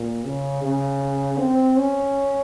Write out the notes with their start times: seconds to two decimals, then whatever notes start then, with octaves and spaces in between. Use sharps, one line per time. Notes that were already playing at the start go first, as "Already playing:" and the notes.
Already playing: A#2
0.25 C#3
0.63 C#3
1.39 C4
1.78 C#4